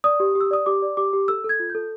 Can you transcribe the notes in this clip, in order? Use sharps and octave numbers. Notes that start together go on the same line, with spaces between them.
D5 D#6
G4
G4
E6
D5 D#6
G4 D6
D5
G4 D6
G4
A4 E6
A4
G#6
F4
A4 G6